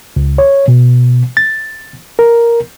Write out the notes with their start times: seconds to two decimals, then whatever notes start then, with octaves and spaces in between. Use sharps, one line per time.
0.16 C#2
0.38 C#5
0.68 B2
1.37 A6
2.19 A#4